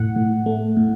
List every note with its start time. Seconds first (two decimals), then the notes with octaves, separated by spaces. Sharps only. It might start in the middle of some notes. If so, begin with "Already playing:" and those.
Already playing: A2 F#5
0.16 A2
0.46 A3
0.77 A2